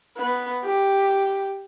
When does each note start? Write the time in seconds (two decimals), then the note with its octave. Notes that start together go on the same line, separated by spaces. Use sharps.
0.17 B3
0.64 G4